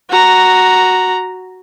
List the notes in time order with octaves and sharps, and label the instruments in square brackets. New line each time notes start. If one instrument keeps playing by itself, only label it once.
[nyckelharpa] F#4 A#5